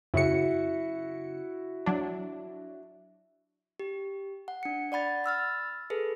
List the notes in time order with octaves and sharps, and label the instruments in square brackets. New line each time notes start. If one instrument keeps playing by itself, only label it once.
[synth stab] F#2 C#3 C#7 [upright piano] E4 F#4
[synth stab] F#3 D4
[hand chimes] G4
F#5
D4 C#7
D5 F#5 B5 A6
B5 E6 F6 A6
G#4 A4 B4